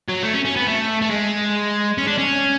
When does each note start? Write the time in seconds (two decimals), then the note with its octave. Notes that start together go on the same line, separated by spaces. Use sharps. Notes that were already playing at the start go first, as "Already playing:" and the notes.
0.09 F#3
0.23 A3
0.33 C#4
0.45 C#4
0.56 B3
0.67 A3
1.01 A3
1.10 G#3
1.98 C#4
2.07 D4
2.18 C#4